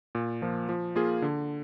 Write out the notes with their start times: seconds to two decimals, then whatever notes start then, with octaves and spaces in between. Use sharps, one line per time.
0.15 A#2
0.42 F3 A#3
0.69 F3
0.95 A#3 F4 G#4
1.22 D3